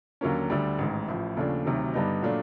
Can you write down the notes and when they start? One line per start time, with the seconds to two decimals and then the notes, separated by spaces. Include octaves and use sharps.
0.21 D#2 D3 F#3 A#3 C#4
0.50 D2 D3 G3
0.78 A1 G#2 D#3
1.08 A1 A2 F3
1.37 D#2 C#3 F3 A3 D4
1.65 D2 C3 D#3 F#3
1.94 G2 D3 G3 B3 D#4
2.22 A#2 F#3 A3 D4 F4